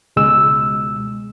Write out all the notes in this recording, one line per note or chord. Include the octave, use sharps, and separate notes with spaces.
C#2 B2 G#3 E6